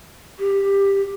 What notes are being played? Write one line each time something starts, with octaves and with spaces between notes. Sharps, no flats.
G4